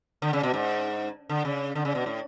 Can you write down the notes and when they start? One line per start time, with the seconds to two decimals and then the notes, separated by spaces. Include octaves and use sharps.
0.22 D3
0.33 C#3
0.43 B2
0.54 G#2
1.29 D3
1.45 C#3
1.75 D3
1.85 C#3
1.95 B2
2.06 A2